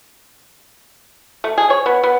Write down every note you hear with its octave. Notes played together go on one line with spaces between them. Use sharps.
A3
G#4
C#5
B3
B3